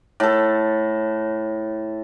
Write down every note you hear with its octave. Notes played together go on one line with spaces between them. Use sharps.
A2 A4